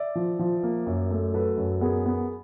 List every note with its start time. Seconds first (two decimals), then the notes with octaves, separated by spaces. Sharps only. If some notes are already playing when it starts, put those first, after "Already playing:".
Already playing: D5 E5
0.15 F3
0.39 F3
0.63 A#3
0.86 F#2
1.11 A3
1.34 F#3 A4 B4
1.57 F#2
1.81 B3 G#4 A#4
2.06 B3